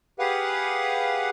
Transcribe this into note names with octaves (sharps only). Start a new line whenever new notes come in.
G4 G#4 B4 F5 F#5